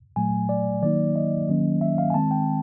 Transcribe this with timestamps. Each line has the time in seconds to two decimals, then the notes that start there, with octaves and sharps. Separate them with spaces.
0.16 A#2 F#3 A3 G#5
0.49 D5
0.82 D#3 F#3 A#3 D#4 D5
1.16 D#5
1.49 D#3 F#3 A#3 C#4
1.81 E5
1.98 F5
2.10 G#5
2.14 D#3 G#3 C4 A5
2.31 G5